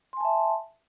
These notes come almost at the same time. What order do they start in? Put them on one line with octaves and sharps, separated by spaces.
C6 G#5 A5 E5